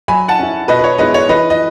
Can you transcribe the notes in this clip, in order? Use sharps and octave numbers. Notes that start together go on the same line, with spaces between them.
F#3 G#5 B5
F#5 A5
C#4 E4
B2 B4 D#5
B4
C#5
G#3 B3 E4 B4 D#5
C#5
E3 B4 D#5
D#5